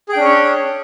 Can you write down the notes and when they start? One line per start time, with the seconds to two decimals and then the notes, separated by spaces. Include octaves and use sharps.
0.09 G#4
0.13 G5
0.17 D4
0.20 C#4
0.24 C#5